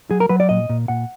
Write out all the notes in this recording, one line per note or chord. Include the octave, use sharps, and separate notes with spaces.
F#3 G#4
A#4
F#3 B4
D5
A#2 D#5
A#2
A#2 F#5